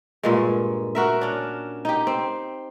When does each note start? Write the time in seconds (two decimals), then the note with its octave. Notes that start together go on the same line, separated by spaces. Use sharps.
0.23 G2 A#2 G#3
0.95 F#4 A#4 E5
1.21 C#4 D4
1.85 D#4 G4
2.07 C4